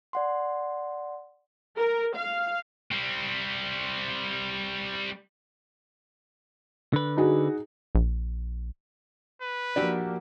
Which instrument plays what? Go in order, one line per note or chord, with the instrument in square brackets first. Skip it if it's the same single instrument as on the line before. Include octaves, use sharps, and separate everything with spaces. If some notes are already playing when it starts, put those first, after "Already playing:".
[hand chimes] D5 F#5 C6
[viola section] A#4
F5
[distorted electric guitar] G3 C4
[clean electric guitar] D3 B4
[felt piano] D#4 F#4 G#4
[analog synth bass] A#1
[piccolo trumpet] B4
[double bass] F3 A#3 [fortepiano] D4 [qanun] F#4 G4 E5